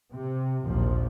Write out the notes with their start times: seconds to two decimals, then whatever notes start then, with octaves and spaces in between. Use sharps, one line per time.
0.12 C3
0.64 A#1 D#2 A#2 F3